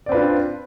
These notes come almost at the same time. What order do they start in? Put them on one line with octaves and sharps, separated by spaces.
D5 C4 B4 F4 D4